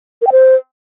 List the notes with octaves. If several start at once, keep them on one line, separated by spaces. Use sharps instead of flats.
A#4
G5
C5